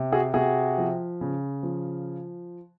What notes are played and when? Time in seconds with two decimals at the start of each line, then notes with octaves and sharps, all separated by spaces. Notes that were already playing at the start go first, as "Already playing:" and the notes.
Already playing: C3
0.12 F#4 G#4
0.34 C3 F#4 G#4
0.78 F3
1.21 C#3
1.63 F3